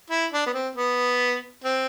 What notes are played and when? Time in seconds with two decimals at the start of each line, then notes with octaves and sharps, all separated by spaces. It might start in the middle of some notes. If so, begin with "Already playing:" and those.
0.10 E4
0.32 D4
0.46 B3
0.53 C4
0.75 B3
1.64 C4